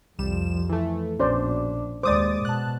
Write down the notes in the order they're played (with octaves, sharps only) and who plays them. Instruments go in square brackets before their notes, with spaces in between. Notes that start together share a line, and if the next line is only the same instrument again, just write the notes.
[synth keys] C2 G3 E7 [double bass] F2 F3
[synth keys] E3 A3
[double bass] A#1 D4 [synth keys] B2 [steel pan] C#4 C5 D5
[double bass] D#2 G#3 [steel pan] C5 D5 [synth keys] D6 D#6 A6
[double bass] B2 [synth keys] A5 F#6